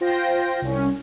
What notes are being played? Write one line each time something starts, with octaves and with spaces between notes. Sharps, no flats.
F4 C5 G5 A#6
C2 C#4